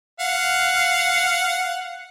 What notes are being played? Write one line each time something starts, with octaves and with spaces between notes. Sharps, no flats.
F5 F#5